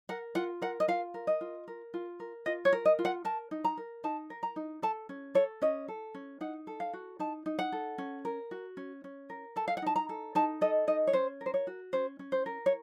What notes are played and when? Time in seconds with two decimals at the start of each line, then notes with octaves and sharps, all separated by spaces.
0.09 A#4 F#5
0.35 F4 F#5
0.62 A#4 F#5
0.80 D#5
0.88 F4 F5
1.14 A#4
1.27 D#5
1.41 F4
1.68 A#4
1.94 F4
2.20 A#4
2.46 F4 D#5
2.65 C#5
2.73 A#4
2.85 D#5
2.99 F4
3.05 F#5
3.25 A#4 A5
3.51 D#4
3.64 A#5
3.77 A#4
4.04 D#4 A5
4.30 A#4
4.43 A#5
4.56 D#4
4.82 A4 A5
5.09 C#4
5.35 A4 C#5
5.62 C#4 D#5
5.88 A4
6.14 C#4
6.41 D#4 F#5
6.67 A4
6.80 F5
6.93 F#4
7.19 D#4 A5
7.46 D#4
7.59 F#5
7.72 A4
7.98 C#4
8.25 A#4
8.51 F#4
8.77 C#4
9.04 C#4
9.30 A#4
9.56 A4 A5
9.68 F5
9.77 F#5
9.82 D#4 A5
9.96 A#5
10.09 A4
10.35 D#4 A5
10.61 A4 D#5
10.87 D#4 D#5
11.07 C#5
11.13 C#4 C5
11.41 A#4
11.46 C5
11.54 C#5
11.67 F#4
11.93 C#4 C5
12.19 C#4
12.32 C5
12.46 A#4
12.66 C#5